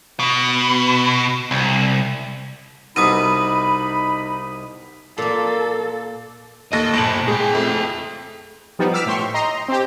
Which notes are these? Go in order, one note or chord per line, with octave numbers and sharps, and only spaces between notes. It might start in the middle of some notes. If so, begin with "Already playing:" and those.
B2
C2
C2 B2 D#4 B5 D#6 D#7
A#2 A#3 A4
D#2 A4 D#5 A#6
G1 A#2 A5 D7 F#7
G#3 G#4 G5
F2 A3
F3 G3 B3 D#4
D6 E6 F6 B6
A2 G5 C6 C#6
D#5 A#5 C6
C4 G4